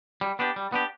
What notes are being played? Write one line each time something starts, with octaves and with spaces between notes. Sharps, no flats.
G3
B3 D4 G4
G3
B3 D4 G4